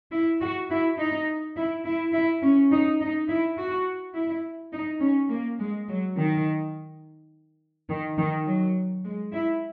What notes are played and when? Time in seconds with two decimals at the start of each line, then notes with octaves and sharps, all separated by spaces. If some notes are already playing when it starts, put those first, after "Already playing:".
0.12 E4
0.40 F#4
0.70 E4
0.98 D#4
1.56 E4
1.85 E4
2.13 E4
2.42 C#4
2.72 D#4
3.00 D#4
3.28 E4
3.57 F#4
4.14 E4
4.73 D#4
5.01 C#4
5.29 A#3
5.59 G#3
5.88 F#3
6.17 D#3
7.89 D#3
8.18 D#3
8.46 F#3
9.03 G#3
9.32 E4